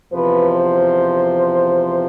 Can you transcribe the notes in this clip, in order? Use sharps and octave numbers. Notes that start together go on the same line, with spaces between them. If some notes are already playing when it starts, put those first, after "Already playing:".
E2 C3 F3 B4
C5